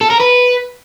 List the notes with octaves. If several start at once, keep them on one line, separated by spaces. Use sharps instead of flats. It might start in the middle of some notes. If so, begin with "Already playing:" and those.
A4
A#4
B4